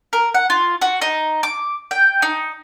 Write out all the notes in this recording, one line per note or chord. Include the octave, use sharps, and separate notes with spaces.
A#4
F#5
F4
F#4
D#4
D6
G5
D#4